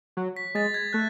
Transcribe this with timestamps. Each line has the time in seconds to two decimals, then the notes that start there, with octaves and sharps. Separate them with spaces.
0.17 F#3
0.36 B6
0.55 G#3 A6
0.74 G#6
0.93 A3 F#6